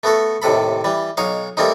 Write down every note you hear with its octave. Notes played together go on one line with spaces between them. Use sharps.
A3 B3 F#4 A4
D#2 A2 C3 A4 B5
E3 G3
B1 D#4 C#5 F5
G3 A3 A#3 C4 D#4